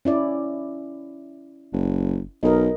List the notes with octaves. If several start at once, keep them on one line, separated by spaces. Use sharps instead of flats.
C#4 E4 D5
F#1
B1 A#4 D#5